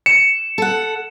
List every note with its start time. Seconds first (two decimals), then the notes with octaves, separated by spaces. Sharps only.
0.06 C#7 E7
0.58 A4 F#5